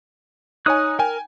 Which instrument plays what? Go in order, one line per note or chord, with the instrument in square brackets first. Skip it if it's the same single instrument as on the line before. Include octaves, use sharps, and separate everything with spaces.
[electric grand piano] D#4 C#5 G#5 [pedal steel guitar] D#6 F#6
[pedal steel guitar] A#4 [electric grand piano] G5 G#5